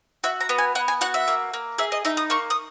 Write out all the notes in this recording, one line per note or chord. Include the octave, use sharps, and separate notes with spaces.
F#4 E5
A#5
B3
G#5
B3 F#5
G#5
F#4 F#5
E5
A#3
A#3
G#4 E5
D#5
D#4 E5
D#6
A#3 C#6
D#6